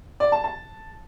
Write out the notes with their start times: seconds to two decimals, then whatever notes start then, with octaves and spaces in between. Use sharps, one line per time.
0.20 D5
0.32 A5
0.44 A5